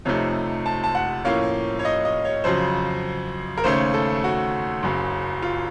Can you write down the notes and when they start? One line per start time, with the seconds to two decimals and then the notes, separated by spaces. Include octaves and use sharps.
0.05 F2 C3 F3 A3 D#4 C#5
0.66 A5
0.84 A5
0.95 F#5
1.25 A2 F3 A#3 C#4 F5
1.79 C#5
1.85 D#5
2.05 D#5
2.25 C#5
2.44 F2 C#3 F#3 C5
3.58 A#4
3.64 D#2 C#3 A3 C#4 C5
3.94 A4
4.24 F#4
4.83 F#1 F#2 C#3 F#3
5.43 F4